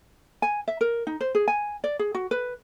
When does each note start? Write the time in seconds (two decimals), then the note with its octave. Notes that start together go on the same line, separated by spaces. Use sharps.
0.42 G#5
0.68 E5
0.81 A#4
1.07 D#4
1.21 C5
1.35 G#4
1.48 G#5
1.84 D5
1.99 G#4
2.15 F#4
2.31 B4